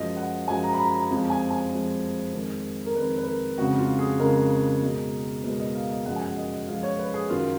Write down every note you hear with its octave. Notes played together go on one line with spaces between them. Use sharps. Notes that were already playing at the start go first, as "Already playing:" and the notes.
Already playing: F#2 F3 G#3 D#5
F#5
F#2 F3 G#3 G#5
A#5
B5
A#5
A#5
F2 F3 G#3
G#5
G#5
F2 F3 G#3
F2 D#3 G#3
A#4
F2 D#3 G#3 B4
B4
A#4
F2 C#3 G#3 F#4
F4
G#4
F2 C#3 G#3 A#4
B2 G#3
B2 G#3 B4
D#5
F5
D#5
F#2 F3 G#3 F#5
G#5
F#5
D#5
D#5
F#2 F3 G#3 F5
C#5
B4
G#4
F#2 D#3 F#3 F4